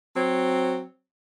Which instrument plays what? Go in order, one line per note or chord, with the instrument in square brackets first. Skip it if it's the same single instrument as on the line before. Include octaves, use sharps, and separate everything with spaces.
[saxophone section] F#3 C4